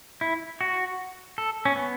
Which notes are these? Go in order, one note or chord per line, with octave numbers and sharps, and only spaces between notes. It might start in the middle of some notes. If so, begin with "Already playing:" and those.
E4
F#4
A4
C#4
B3